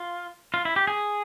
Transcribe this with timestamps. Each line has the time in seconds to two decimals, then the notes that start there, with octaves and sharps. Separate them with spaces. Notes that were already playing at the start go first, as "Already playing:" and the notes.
Already playing: F4
0.54 F4
0.65 E4
0.76 G4
0.87 G#4